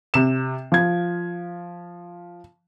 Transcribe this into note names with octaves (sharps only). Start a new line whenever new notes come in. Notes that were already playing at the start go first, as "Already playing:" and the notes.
C3 E7
F3 G#6